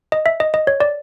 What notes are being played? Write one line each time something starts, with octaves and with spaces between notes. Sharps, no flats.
D#5
E5
D#5
D#5
C#5
D5